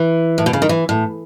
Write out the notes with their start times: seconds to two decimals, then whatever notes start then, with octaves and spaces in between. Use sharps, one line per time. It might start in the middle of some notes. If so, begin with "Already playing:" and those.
Already playing: E3
0.38 A2
0.46 B2
0.53 C#3
0.62 D#3
0.69 E3
0.89 A2